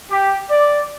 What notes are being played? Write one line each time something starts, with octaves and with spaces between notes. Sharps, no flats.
G4
D5